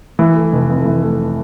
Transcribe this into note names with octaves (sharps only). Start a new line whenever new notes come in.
E3
A3
F1
F2
E3
A3